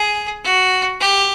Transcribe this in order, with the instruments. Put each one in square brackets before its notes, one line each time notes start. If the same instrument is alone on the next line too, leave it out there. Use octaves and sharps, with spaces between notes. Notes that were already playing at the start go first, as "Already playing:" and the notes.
Already playing: [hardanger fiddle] G#4
F#4
G4